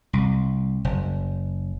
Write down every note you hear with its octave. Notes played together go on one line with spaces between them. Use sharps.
C2
F#1